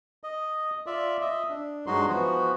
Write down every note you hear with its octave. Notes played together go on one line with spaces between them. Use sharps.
D#5
F4 D5 E5
D#5 E5
D4
G2 F#3 G#3 D#4 F#4 C6
E3 F3 B3 F#4